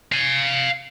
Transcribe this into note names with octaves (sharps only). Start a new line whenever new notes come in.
F5 G#5